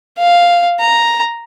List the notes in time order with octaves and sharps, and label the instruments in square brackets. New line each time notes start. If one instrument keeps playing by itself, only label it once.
[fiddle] F5
A#5